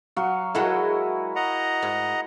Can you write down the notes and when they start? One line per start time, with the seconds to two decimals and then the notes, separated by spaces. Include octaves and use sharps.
0.16 F#3 F#4 F5
0.55 F#3 G#3 E4 F#4 A4 A#4
1.36 D#5 F#5 A#5
1.83 G#2